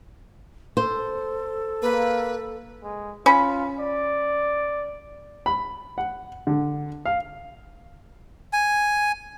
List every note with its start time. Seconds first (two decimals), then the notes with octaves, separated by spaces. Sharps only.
0.77 A4 C5
1.82 A#3 B4
2.83 G#3
3.26 C#4 F4 B5
3.79 D5
5.46 B5
5.98 F#5
6.47 D3
7.05 F5
8.53 G#5